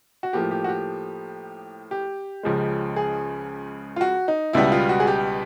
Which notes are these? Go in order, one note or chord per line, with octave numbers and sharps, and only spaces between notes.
F#4
A2 F3 A#3 G4
G4
F#4
G4
G4
C#2 C#3 F3 G#3
G#4
F4
F#4
D#4
C#2 B2 G3 B3 E4
F4
F#4
G#4
G4